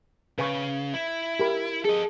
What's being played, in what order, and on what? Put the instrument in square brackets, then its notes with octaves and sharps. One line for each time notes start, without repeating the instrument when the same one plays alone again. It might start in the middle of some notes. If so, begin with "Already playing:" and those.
[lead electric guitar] C#3 [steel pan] B4 G#5 C#6
[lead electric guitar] E4
[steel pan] G4 A#4 B5
[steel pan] G#4 [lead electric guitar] A4 D#5